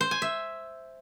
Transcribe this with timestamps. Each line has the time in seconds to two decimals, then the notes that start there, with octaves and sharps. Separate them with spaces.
0.01 C5
0.11 G#5
0.22 E5